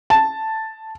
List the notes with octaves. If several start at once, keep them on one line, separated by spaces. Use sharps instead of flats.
A5